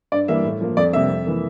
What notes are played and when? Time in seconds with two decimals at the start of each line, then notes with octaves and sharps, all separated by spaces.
0.12 G2 D5
0.28 E3 G3 A#3 E5
0.45 A2
0.61 F3 A#3
0.77 F2 D5
0.93 C3 G3 A#3 E5
1.09 F2
1.26 E3 A#3